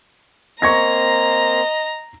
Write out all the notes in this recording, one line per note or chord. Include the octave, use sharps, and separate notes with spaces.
A#3 C4 D#5 A#5 C#6 G#6 A#6